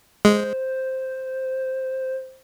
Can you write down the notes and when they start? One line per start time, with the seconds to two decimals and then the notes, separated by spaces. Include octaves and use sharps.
0.25 G#3 C5